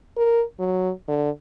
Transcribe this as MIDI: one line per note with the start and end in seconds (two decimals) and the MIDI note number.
0.17 0.43 70
0.59 0.91 54
1.08 1.30 50